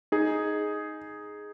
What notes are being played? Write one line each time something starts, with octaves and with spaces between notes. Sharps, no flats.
D#4 G#4